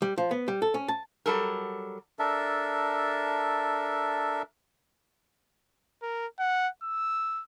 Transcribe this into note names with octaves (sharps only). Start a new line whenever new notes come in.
G3
F3
B3
G3
A4
C#4
A5
F#3 G3 A4 A#4
D4 A4 A#4 E5
A#4
F#5
E6